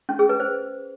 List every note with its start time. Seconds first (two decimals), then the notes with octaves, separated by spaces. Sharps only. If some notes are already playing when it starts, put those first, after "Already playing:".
0.09 C#4
0.19 G#4
0.29 B4
0.40 C5